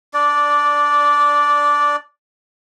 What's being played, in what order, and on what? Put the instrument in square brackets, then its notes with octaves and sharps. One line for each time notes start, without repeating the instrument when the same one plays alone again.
[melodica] D4 D5